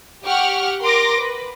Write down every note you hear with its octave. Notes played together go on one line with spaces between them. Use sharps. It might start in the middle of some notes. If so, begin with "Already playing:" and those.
G4 F#5 C#6 F6
A#4 C6 D6 A#6
B4